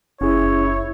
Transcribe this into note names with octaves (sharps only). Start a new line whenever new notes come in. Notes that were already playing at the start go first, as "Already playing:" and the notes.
F#1 C#4 E4 G#4 C#5